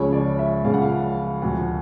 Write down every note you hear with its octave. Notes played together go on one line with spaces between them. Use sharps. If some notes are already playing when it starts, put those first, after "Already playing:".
Already playing: C#2 C#3 F3 C#5
D5
E5
C#2 C#3 F3 F5
F#5
F5
D2 C3 F3 F#5